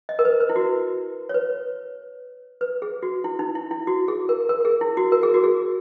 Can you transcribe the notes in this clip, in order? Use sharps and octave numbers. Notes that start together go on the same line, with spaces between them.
D#5
A#4
B4
B4
E4
F#4
C#5
B4
B4
G#4
F#4
E4
D#4
E4
E4
F#4
G#4
A#4
A#4
G#4
E4
F#4
A#4
G#4
F#4
G#4